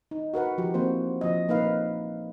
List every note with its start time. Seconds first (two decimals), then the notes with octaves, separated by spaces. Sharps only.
0.11 D#4
0.34 F#4 A#4 B4 F#5
0.58 F3 F#4 G4
0.74 E3 A#3 C4 F#4 C5
1.21 F3 D#5
1.49 A#3 D#4 B4 F5